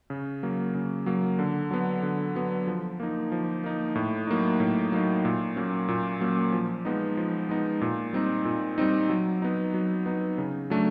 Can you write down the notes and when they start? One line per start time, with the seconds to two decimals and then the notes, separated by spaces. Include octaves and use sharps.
0.10 C#3
0.43 F#3 A#3
0.75 C#3
1.06 F#3 A#3
1.39 D3
1.71 F#3 B3
2.02 D3
2.35 F#3 B3
2.67 F3
3.00 A#3 D#4
3.32 F3
3.64 A#3 D#4
3.95 A2
4.27 F#3 A#3 D#4
4.60 A2
4.92 F#3 A#3 D#4
5.25 A#2
5.56 F#3 A#3 C#4
5.88 A#2
6.21 F#3 A#3 C#4
6.52 F3
6.85 G#3 B3 D#4
7.17 F3
7.49 G#3 B3 D#4
7.81 A#2
8.13 G3 C4 D#4
8.45 A#2
8.78 G3 C4 D#4
9.09 F#3
9.42 B3 D#4
9.74 F#3
10.06 B3 D#4
10.38 C#3
10.70 F#3 A3 D4